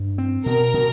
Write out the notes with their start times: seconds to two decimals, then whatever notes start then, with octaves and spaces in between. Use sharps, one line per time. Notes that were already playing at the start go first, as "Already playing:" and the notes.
Already playing: G2
0.18 C4
0.46 B2 A#4
0.74 B2